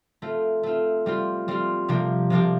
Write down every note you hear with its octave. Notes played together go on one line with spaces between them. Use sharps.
A3 C4 F4
A3 C4 F4
G3 C4 F4
G3 C4 F4
C3 F3 A#3 D4 G4
C3 F3 A#3 D4 G4